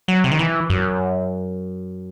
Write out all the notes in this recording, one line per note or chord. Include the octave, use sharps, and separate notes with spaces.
F#3
C3
D#3
E3
F#2